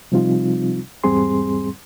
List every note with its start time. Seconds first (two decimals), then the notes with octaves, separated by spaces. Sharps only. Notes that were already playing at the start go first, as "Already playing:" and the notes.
0.12 C3 F3 G3 C4 D#4 F4
1.04 E2 G#2 G3 C4 G#4 C6